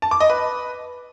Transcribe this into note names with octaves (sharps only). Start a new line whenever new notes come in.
A5
D6
D#5
B4